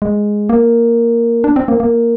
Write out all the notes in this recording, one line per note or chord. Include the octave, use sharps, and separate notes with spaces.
G#3
A#3
D4
C4
A#3
A#3